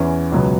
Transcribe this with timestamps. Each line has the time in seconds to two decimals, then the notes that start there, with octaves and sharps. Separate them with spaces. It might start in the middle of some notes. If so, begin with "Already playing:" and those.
Already playing: E2 E3 C#4
0.32 C#2 B2 F#3 B3